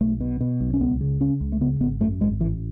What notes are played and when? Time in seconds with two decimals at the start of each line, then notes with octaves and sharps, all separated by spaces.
0.01 B1 A3
0.21 B2
0.41 B2
0.60 B1
0.74 C#4
0.80 C#2 B3
1.01 C#3
1.20 C#3 C#4
1.41 C#2
1.52 A3
1.61 C#3 B3
1.80 G#1 B3
2.00 F#2 A3
2.20 G#1 G#3
2.40 A1 E3